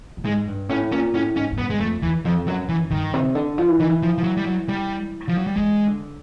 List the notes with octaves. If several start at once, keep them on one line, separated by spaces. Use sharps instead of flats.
A2
G#2 G#3
G2
A2 C#4
A#2 C#4
A2 C#4
G#2 C#4
G#2
G2 B3
G#3
F2 A3
E2 E3
F2 F3
F#2 F#3
F#2 E3
G2 D#3
C3
D3
F3
E3
D#3 E3
E3
F3
F3
F#3
G3
F#3
G3
F3
F#3
G3
E3 G#3
D3